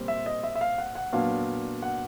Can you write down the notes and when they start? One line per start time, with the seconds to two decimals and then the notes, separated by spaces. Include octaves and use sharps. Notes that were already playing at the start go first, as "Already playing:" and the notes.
Already playing: A#2 G3 C4
0.08 E5
0.26 D#5
0.43 E5
0.55 E5
0.61 F5
0.78 F#5
0.95 F#5
1.13 A#2 F#3 B3 D4 F5
1.83 F#5